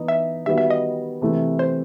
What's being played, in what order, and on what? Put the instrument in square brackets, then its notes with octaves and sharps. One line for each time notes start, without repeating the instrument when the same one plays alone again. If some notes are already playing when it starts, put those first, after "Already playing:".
Already playing: [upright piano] E3 B3 D#4
[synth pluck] E5
[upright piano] D#3 G3 B3 F#4 [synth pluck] E5
[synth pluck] E5
D#5
[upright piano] C3 E3 A3 E4
[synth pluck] C5